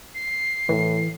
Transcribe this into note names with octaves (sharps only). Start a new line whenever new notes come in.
C7
A2 E3